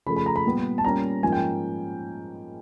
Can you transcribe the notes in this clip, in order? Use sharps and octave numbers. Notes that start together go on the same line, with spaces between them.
C#3 F3 A3 B5
B5
A#5
B5
A#2 G3 B3
A5
A#2 G3 A#3 C#4 A#5
G#2 F3 A#3 C#4 G#5
G5